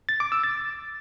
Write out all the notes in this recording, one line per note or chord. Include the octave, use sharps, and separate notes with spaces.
A6
D6
E6
A6